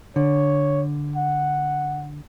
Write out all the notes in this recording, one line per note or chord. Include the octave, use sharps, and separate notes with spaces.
D3 C#5
F#5